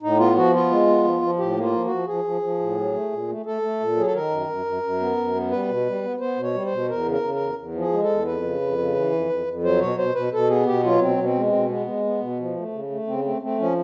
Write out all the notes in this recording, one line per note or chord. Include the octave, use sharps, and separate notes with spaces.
A2 D#4
B3 F4
F3 F#4
B3 F4
G#3
B3
F3
F3
A2 G4
A#3
F4
F3
F#4
F3
F3 G#4
F3
F3
A2
F#3
A3
A#2
A3
A3 A4
A3
A#2
F#3 G#4
A4
D#3 A#4
F#2
F#2
F#2
F#2
B3
F#2
B3
G3 B4
B2
G3
B3
B3 C5
B2
C#5
G3
C5
B2
E2 A#4
C#3
A#4
C#3
A#4
E2
E2
F3
G#4
G#3
A4
E2
F2 B4
C#3
F2
C#3
E3
F2
F2
F2
F#3 C5
B2 C#5
B2 C5
B2 B4
B2 A4
B3 G#4
B2 G4
F#3 F4
B2 C4
B2
C4
G#3
C4
B2
G#3 B3
G#3
B3
B2
F3
A3
C#3
A3
C#3 C4
A3 C4
A3 C4
F3 C#4